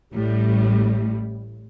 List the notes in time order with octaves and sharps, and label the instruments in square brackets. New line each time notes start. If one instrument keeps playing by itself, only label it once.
[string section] A1 A2 G3